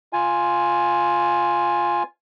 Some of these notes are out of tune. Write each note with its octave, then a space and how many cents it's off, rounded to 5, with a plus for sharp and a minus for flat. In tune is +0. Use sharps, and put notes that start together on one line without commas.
F4 +0 G#5 +0